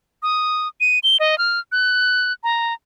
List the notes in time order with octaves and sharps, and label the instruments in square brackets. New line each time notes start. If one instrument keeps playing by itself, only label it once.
[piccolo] D#6
D#7
G7
D#5
F6
F#6
A#5